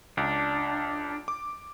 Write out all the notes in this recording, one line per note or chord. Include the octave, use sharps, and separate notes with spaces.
C#2 D4
D6